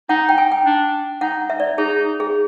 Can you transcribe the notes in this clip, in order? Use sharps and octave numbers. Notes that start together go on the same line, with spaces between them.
D#4 F#5
G5
G#5
G5
D4
D#4 F#5
E5
D5
D#4 G#4
G#4